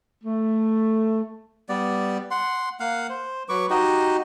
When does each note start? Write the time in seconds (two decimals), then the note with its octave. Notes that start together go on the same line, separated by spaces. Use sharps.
0.24 A3
1.69 G3 B3 D5
2.31 F#5 C6
2.80 A#3 F5 F#5
3.09 C5
3.49 F#3 B4 C#6 D6
3.70 D#4 F#4 G4 D#5